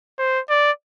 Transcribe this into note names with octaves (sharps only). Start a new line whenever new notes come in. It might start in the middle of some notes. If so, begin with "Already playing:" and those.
C5
D5